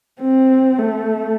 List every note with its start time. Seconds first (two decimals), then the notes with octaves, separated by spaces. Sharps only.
0.20 C4
0.79 A3